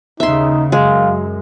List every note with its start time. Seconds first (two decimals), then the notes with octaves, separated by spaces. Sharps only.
0.20 D#2 C#3 D#4 E5 C6
0.72 F#2 G#3 F5